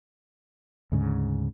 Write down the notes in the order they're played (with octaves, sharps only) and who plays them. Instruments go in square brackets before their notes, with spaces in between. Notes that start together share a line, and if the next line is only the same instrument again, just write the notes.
[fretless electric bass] D2 G#2 C#3